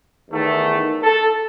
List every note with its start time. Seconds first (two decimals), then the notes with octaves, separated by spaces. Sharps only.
0.30 E2 D#3 A3
1.03 A4